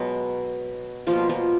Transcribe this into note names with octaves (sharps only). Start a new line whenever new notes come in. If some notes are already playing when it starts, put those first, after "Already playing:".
Already playing: B2 F#3 G#3 B3 F#4
B2 F3 G3 A#3 F4
F3 F4